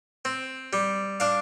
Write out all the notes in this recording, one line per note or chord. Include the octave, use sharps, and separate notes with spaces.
C4
G3
D4 F5